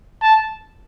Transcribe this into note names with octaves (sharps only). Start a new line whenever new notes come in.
A5